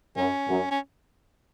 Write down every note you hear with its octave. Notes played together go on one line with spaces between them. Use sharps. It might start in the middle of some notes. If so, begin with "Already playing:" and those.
F#2 C#4
F#2
C#4